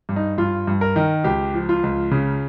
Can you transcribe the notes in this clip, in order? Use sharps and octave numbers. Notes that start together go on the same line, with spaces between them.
G2
D#4
G2 F4
G2
A#4
D#3
C#2 G4
F3
F4
C#2
C#3